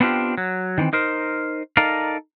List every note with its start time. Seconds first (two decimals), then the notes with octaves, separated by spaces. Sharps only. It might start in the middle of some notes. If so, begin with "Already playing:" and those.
0.01 B3 C4 D4 F4 G4
0.38 F#3
0.78 D#3 E3 A#3 C4
0.93 D#4 A#4 C5
1.77 D#4 A4 A#4 D5 D#5 F5